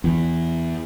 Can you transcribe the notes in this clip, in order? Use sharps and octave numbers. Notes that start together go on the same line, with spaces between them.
E2